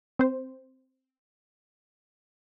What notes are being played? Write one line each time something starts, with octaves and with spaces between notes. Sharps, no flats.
C4 C5